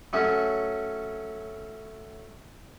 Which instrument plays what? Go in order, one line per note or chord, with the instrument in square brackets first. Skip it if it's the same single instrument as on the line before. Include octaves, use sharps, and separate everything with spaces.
[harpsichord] F#3 A3 C#4 F#4